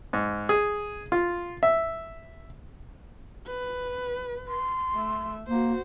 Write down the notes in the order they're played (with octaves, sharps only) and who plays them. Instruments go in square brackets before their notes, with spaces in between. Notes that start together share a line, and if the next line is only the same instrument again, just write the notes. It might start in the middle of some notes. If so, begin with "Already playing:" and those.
[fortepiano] G#2
G#4
F4
E5
[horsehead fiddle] B4
[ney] C6
[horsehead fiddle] A3 E5
[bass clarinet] A#3 [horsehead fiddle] F#4 C5